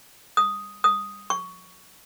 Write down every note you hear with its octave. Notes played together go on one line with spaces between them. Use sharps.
D#6
D#6
C#6